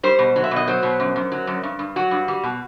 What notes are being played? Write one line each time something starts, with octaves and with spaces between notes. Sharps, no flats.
G3 C5
B2
F#3
E5
B2
D#5
F#3 C5
B2
F#2
F#2
F#3
F#2
G2
G2
F#3 F#4
G2
G3
B2